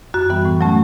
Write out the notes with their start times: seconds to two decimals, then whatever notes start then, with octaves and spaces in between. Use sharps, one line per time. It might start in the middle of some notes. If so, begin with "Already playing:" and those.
0.14 F#2 F#4
0.30 E3 G3 B3
0.45 A2
0.61 F#3 A3 C#4